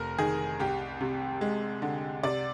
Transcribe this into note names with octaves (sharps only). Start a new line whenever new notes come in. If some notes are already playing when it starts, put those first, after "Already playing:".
Already playing: F1 A#4
D#3 G#4
C2 G4
C3
G#3
D3
C3 D5